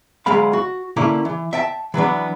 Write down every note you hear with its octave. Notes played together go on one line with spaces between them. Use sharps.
D2 F#3 G#3 F5 B5
F#4
D3 A#3 C#4 E4
E3
E5 G5 A5
E3 F#3 B3 D4